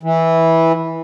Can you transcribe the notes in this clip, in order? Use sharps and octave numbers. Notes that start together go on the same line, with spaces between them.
E3